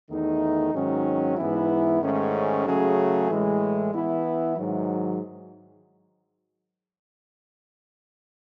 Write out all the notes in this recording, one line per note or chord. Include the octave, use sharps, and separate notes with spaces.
E2 D#3 A3 D#4
G#2 D#3 F#3 C#4
G#2 E3 B3 E4
G#2 D#3 A3 C#4
C#3 F#3 A3 C#4 G#4
A2 E3 G#3
E3 B3 E4
G#2 D#3 F#3